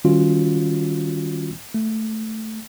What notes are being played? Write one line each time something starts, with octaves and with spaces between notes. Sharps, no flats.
D#3 G3 C#4 F4 F#4
A3